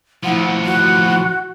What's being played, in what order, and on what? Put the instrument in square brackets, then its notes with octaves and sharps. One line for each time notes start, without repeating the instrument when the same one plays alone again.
[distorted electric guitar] A2 F3 [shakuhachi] E4 [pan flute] F#5
[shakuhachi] F#4